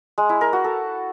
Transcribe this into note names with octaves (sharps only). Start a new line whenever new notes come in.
G#3
E4
A#4
F#4
A4